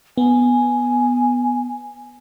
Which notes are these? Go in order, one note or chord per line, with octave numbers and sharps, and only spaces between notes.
B3 G#5